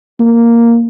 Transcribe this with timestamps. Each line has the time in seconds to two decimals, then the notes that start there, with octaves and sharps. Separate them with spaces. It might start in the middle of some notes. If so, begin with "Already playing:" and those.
0.20 A#3